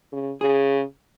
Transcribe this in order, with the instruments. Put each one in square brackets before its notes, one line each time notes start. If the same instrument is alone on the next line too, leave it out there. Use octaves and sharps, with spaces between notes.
[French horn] C#3
[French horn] C#3 [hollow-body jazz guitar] G#4